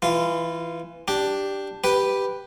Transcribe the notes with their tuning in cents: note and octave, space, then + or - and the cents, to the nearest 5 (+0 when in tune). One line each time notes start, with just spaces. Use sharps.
E3 +0 F4 -20
D4 +0 G4 +0
G4 +0 B4 +0